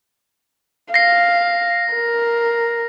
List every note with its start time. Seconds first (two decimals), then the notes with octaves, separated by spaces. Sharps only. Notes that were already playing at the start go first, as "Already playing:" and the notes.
0.94 F5 A#6 C7
1.93 A#4